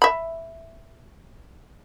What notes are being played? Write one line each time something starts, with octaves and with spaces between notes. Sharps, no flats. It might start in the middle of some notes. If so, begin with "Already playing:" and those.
E5 B5